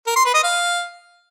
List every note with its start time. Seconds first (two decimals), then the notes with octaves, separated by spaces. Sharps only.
0.07 A#4
0.16 C6
0.25 B4
0.34 D#5
0.43 F5